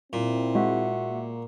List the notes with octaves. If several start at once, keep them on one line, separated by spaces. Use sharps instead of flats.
A#2 C4 E4
G#3 F#4 E5 F#5
A#3